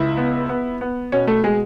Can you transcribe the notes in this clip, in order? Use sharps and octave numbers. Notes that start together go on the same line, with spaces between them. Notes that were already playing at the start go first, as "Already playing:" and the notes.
Already playing: C#2 E4 E5
B3
B3
B3
B2 C#4 C#5
A3 A4
B2 G#3 G#4